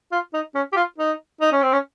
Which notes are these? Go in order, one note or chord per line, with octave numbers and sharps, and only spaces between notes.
F4
D#4
C#4
G4
F4
D#4
D#4
C#4
C4
C#4